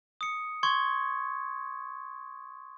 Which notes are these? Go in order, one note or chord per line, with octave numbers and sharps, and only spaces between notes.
D#6 C#7
C6 C#6 G#6